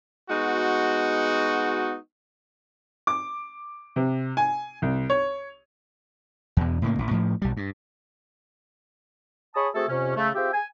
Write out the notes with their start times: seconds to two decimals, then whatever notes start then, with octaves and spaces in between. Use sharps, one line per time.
0.30 G#3 B3 D#4 F#4
3.07 D6
3.96 C3
4.37 G#5
4.82 C2
5.10 C#5
6.57 E2 B2
6.82 A2 C#3 A#3
6.99 A1
7.11 A2 F3
7.42 B1 G3
7.57 G2
9.55 G#4 C#5 A5 B5 C#6 D#6
9.74 A3 C4 F#4 G#4 A4
9.89 F2 C3 C#4
10.16 C#3 A3
10.34 C4 F4 G4 G#4 E5 G5
10.53 G#5